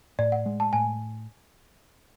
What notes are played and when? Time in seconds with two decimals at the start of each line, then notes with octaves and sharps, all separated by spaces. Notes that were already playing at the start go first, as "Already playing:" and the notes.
0.19 A2 D5
0.32 F#5
0.46 G#3
0.60 A5
0.73 A2 G#5